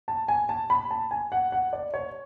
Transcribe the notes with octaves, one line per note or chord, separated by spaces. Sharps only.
A5
G#5
A5
B5
A5
G#5
F#5
F#5
D5
C#5